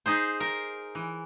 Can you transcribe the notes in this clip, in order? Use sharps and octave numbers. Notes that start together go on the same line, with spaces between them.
D#4 G#4 C5
A#4
E3